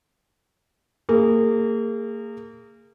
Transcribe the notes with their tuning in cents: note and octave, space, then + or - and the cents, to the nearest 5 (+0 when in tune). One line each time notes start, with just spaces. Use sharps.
A#3 -30 G#4 -20